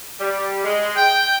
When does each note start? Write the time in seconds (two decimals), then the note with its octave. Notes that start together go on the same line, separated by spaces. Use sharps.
0.20 G3
0.64 G#3
0.96 G5